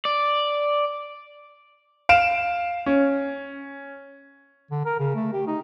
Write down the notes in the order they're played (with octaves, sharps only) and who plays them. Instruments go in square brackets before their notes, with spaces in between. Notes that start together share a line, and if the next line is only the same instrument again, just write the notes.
[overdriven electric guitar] D5
[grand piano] F5 D7 E7
C#4
[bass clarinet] D3
A#4
C#3
A3
G4
D#4